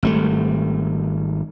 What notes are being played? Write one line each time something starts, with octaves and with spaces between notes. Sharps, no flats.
G#1 G3 A3